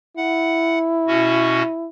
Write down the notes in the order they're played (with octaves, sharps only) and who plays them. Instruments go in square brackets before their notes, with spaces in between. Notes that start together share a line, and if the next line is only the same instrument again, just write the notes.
[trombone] E4 [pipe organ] F#5
[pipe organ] B2 C#4 F#4